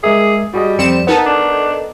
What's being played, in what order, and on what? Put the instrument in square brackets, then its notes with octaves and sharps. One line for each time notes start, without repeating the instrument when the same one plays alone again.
[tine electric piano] G#3 A#4 E5 [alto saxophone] G#4
[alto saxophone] G3 [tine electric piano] F#4 G#4 D#5
[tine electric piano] F2 D5 [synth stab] C4 C#7 E7
[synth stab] B3 D#4 A4 [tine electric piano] A#4
[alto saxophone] D4